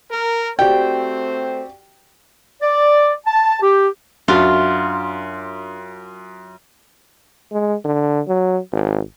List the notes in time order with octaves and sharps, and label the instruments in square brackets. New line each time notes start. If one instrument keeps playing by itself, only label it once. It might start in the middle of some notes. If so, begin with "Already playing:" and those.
[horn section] A#4
[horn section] A3 C4 C5 [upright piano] F#4 G4 D5 [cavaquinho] G5
[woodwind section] D5
A5
G4
[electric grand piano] F#2 [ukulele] D4 F#4 E5 [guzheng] F4
[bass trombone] G#3
D3
F#3
G#1